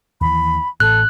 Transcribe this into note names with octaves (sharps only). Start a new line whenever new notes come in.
D#2 E3 B5
A1 A2 A4 F#6